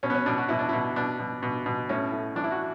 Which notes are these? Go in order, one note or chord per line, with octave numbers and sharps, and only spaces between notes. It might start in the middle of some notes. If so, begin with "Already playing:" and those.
B2 C#4
B3
C#4
B2 D4
F#4
B2 E4
D4
B2 E4
B2 D4
B2
B2
B2
A2 C#4
A2
E3 D4
E4
F#4